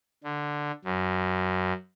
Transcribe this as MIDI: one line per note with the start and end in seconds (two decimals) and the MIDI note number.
0.24 0.71 50
0.85 1.73 42